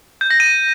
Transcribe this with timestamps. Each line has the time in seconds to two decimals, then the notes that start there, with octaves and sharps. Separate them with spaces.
0.21 G6
0.30 A#6
0.40 D#7